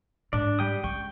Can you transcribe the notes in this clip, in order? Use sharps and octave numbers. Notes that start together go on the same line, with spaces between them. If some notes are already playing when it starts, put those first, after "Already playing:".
G#2 D4 D5
G3 G5 D#6
C#3 G#3 G5 C#6